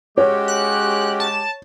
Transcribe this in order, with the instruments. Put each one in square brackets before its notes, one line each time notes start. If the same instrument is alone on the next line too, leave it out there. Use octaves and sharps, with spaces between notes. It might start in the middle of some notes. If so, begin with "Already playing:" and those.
[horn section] G#3 G4 [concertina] C#4 F#4 [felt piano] C#5
[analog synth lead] F#6
A5